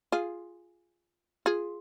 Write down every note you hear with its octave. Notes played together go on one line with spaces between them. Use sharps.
F4 G#4
F4 G#4